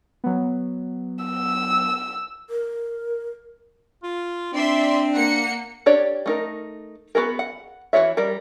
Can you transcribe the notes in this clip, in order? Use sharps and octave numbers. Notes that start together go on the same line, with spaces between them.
F#3 B3
E6
A#4
F4
C4 D4 D5 E5 C6
A#3 F#5 C#7
D4 G4 C#5 D5
A3 D#4 A#4
B3 F#4 G#4 A#4
F#5
E3 F4 F#4 C#5 E5
G3 A#4